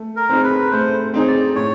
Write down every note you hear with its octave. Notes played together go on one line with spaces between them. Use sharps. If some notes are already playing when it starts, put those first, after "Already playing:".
Already playing: A3
A#4
C4 D#4 G#4
B4
A3 C5
C4 D#4 G#4
D5
A2 C#5